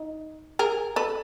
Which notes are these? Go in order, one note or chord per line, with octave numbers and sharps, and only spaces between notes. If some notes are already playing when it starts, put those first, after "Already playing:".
Already playing: D#4
G#4 A#4
A4 B4